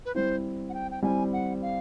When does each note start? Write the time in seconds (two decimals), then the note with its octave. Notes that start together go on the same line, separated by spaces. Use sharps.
0.05 B4
0.15 G3 C4 E4 C5
0.69 F#5
0.74 G5
0.91 G5
1.02 G3 C4 E4 G#5
1.33 F#5
1.62 F5